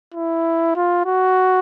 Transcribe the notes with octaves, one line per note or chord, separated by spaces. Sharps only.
E4
F4
F#4